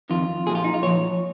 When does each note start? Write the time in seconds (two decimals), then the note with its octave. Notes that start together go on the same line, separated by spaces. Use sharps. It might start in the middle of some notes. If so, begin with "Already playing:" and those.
0.10 F2 D#3 F4
0.46 A#2 G#4
0.50 F3
0.55 F4
0.64 D#4
0.74 F4
0.82 A#2 F3 C#5